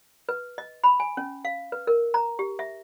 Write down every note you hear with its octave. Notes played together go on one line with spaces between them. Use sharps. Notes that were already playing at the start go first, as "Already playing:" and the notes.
B4
D#5
B5
G#5
C#4
F5
B4
A#4
A#5
G4
E5